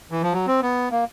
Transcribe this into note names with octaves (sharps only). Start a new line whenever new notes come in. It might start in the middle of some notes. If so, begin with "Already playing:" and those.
E3
F3
F#3
C4
B3
A#3